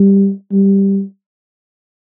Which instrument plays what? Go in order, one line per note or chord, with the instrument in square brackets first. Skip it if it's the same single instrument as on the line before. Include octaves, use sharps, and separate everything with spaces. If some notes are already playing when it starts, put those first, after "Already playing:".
Already playing: [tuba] G3
G3